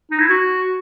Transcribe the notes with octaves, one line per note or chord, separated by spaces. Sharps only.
D#4
E4
F#4